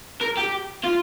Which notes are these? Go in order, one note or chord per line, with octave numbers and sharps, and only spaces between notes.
A#4
G4
F4